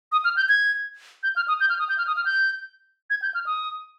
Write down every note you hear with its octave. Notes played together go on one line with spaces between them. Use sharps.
D#6
F6
G6
G#6
G6
F6
D#6
G6
F6
D#6
G6
F6
D#6
F6
G6
G#6
G6
F6
D#6